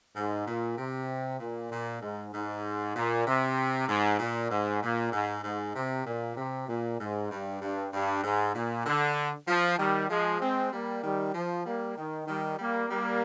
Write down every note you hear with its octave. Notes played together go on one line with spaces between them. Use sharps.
G#2
A#2
C3
A#2
A#2
G#2
G#2
A#2
C3
G#2
A#2
G#2
A#2
G#2
G#2
C3
A#2
C3
A#2
G#2
G2
G2
G2
G#2
A#2
D3
F3
D#3 G3
F3 G#3
G#3 C4
G3 A#3
D#3 G3
F3
G3 A#3
D#3
D#3 G3
G3 A#3
G3 A#3